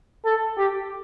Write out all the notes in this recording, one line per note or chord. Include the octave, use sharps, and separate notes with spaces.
A4
G4